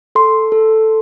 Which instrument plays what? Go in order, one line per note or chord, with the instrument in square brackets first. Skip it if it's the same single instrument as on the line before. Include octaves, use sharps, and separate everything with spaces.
[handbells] A4 C6
A4